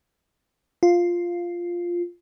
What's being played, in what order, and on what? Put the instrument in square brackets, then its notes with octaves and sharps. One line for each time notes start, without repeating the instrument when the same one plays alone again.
[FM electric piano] F4